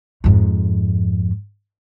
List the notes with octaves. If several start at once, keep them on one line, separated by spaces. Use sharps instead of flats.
F2 G#2